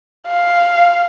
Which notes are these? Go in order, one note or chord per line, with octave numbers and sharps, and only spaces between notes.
F5